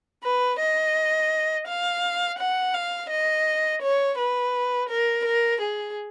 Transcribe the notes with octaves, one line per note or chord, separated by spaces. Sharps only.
B4
D#5
F5
F#5
F5
D#5
C#5
B4
A#4
A#4
G#4